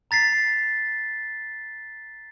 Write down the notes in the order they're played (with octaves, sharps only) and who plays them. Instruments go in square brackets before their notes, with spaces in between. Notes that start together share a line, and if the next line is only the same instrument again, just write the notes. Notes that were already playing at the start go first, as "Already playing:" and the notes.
[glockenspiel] A#5 A6 B6 C7